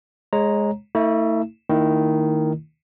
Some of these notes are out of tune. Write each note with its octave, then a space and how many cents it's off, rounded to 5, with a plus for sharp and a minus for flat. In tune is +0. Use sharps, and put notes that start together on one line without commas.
G#3 +0 C#5 -25 A#5 +0
A3 +30 E4 -40
D#3 +0 A#3 -45 E4 +0